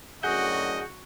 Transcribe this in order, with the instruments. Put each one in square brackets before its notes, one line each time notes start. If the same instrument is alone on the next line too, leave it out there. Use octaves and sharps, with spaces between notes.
[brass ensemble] F#2 A2 D3 [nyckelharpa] F#4 [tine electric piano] G#4 F#5 G6 [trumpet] D#5